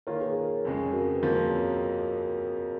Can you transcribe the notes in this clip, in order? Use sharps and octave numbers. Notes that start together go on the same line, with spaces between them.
D#3 A#3 F4 A#4 C#5
G#4 B4
F2 C#3 G#3
F#4 A#4
B4
F2 F3 A#3 F#4 A#4
G#4 B4
A#4 C#5